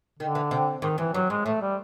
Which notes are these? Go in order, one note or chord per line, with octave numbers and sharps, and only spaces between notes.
D3 D#3
E3
C3
G#2 D#3
G2 E3
G2 F#3
G#2 G#3
A2 A3
G3